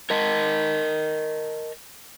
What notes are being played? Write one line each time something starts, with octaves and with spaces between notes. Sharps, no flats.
A#4 D#5 A5